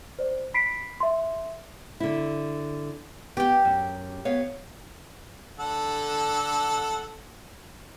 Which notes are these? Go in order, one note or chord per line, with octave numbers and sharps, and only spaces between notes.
C5 D5
B5 B6 C7 D7
E5 C6
D3 E4
B3 G4 G5
F#2
B3 C#5 F5
D3 A4 F#5